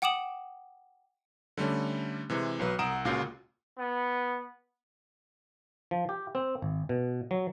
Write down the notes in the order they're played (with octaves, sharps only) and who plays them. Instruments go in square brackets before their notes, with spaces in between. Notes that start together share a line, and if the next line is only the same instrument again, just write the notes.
[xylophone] F#5 G5 D6 D#6 E7 F#7
[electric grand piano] D3 G3 A3 C#4
C3 E3 G#3
B1 F#3 B4
C2 F#5 A#5 D#6 D7 E7
C#2 A#2 C#3 F4 F#4 C7
[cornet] B3
[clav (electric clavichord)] F3
G4
C4
G#1
B2
F#3